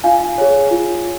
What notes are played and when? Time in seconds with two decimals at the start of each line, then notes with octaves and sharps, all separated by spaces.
0.04 F4 F5 G#5
0.38 G#4 C#5
0.71 F4